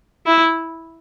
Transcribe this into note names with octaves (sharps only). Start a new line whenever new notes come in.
E4